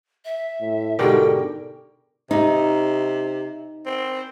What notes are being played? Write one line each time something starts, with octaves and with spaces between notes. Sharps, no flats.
E5
A2
G#2 B2 D3 G4 A4 A#4 G5
C3 D#4
C4